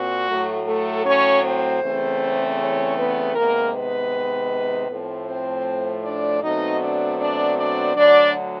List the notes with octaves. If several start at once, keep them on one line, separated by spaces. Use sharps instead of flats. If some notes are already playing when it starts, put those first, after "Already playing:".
Already playing: A#2 C4 F#4
A2 F#3 A3
A3 A4
C#4 C#5
C4 C5
E2 C#3 E3 A3 C4
C#4 C#5
B3 B4
C3 D#3 G#3 A#3 B3 A#4
B3 B4
A2 F3 A3 C4
C4 C5
D4 D5
B2 F#3 A3 C4 D#4 D#5
D4 D5
D4 D5
D4 D5
D2 D3 F#3 D4 D5